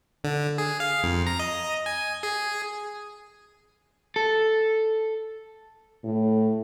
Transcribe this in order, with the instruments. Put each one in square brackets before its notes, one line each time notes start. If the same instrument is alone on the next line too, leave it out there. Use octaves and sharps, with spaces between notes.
[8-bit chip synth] D3
G#4
F5
F2
A#5
D#5
G#5
G#4
[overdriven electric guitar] A4
[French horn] A2